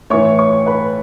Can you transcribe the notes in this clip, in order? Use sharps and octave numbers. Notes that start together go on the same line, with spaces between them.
A2 E3 A3 C#5 C#6
C#5 C#6
B4 B5